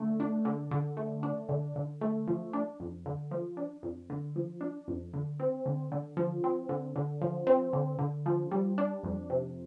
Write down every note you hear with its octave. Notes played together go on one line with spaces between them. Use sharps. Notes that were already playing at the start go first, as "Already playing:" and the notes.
Already playing: D3 A3
D4
D3
D3
A3
D4
D3
D3
A3
F3
D4
F2
D3
F3
D4
F2
D3
F3
D4
F2
D3
C4
D3
D3
F3
C4
D3
D3
F3
C4
D3
D3
F3
G3
D4
F2
C3